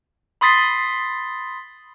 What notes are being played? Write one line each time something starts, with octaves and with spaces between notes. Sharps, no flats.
B5 C6 D#6 A6 B6 C7